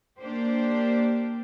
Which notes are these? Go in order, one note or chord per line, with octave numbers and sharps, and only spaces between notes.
A#3 D4 G4 C5